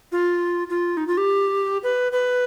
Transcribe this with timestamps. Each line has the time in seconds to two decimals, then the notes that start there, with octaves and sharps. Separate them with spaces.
0.12 F4
0.70 F4
0.97 D#4
1.08 F4
1.17 G4
1.83 B4
2.12 B4